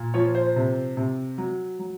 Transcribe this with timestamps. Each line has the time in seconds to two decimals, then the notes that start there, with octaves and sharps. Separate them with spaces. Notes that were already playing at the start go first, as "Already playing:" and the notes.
Already playing: A#2
0.14 F3 C#5
0.35 C5
0.56 C3
0.97 C3
1.38 F#3
1.79 F#3